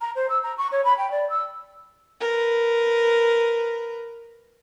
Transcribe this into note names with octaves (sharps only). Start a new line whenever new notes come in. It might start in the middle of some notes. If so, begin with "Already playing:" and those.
A#5
C5
E6
A#5
C#6
C#5
B5
G5
D5
E6
A#4 B4